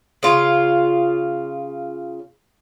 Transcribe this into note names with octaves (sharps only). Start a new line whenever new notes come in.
C#3 F4